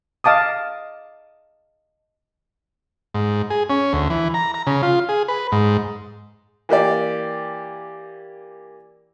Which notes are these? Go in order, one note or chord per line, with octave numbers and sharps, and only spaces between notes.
D#5 F5 A5 D6 D#6
G#2
G#4
C#4
D2
E3
A#5
A#5
C#3
F4
G#4
B4
G#2
E3 A#3 G4 D5